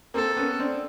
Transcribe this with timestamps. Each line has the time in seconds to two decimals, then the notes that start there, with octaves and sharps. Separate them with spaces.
0.14 A#3 C4 A4
0.37 B3 C#4
0.59 C4 D4